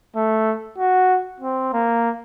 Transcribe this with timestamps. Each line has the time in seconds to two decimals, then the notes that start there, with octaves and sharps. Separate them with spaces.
0.16 A3
0.78 F#4
1.40 C4
1.73 A#3